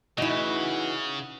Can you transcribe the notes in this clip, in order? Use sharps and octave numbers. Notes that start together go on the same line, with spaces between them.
C#3 E3 D#4 E4 F#4